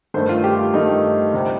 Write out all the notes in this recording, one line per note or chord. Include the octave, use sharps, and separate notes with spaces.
G2 D#3 A3 C5
F4
G4
F4
G2 D#3 A3 D#4
D2 C3 G3